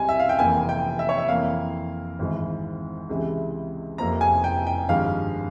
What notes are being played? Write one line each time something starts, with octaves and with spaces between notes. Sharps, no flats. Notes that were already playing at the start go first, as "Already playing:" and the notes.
Already playing: C#2 C3 G3 G#5
E5
F5
G5
F1 F2 E3 A#3 G#5
G5
E5
C#5
E5
F2 E3 A#3 F5
G#1 G#2 E3 G#3
C#2 C3 E3 G#3
F1 F2 C3 F3 A#3 A#5
G#5
G5
G5
G#1 G2 F3 G#3 F5